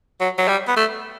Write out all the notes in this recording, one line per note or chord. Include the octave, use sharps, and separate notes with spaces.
F#3
F#3
G3
B3
A3